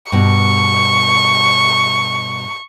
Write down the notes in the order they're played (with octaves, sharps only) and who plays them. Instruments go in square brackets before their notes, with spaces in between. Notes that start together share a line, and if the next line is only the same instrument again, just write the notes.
[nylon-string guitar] G2 B2 [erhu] C#6